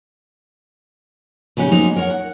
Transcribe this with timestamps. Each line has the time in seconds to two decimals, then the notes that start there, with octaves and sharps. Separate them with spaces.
1.57 C#3 G#3 B3 C#4 D#4 G4
1.71 F#3 G#3 A#3 B3 D#4 C5
1.96 A#4 C#5 F#5
2.10 F#5